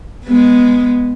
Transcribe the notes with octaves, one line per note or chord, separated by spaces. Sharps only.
G#3 B3